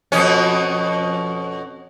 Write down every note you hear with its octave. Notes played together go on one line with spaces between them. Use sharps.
F2 B2 C#4